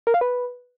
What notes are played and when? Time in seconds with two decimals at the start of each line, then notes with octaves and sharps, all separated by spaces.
0.07 A#4
0.14 F5
0.21 B4